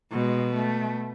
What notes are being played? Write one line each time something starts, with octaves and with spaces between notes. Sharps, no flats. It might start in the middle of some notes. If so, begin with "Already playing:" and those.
B2 G#3
A3